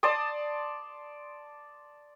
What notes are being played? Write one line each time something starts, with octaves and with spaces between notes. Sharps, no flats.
D5 A5 C6 D#6